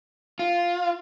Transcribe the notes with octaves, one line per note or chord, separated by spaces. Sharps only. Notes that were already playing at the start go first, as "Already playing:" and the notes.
F4